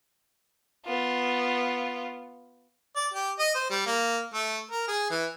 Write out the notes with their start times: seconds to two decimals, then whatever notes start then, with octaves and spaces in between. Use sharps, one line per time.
0.86 B3 F4
2.96 D5
3.13 G4
3.39 D#5
3.55 C5
3.70 G3
3.86 A#3
4.34 A3
4.71 A#4
4.88 G#4
5.10 E3